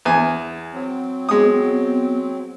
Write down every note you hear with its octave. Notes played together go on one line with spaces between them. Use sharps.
E2 G#5
F#3 C4
G#3 B3 D#6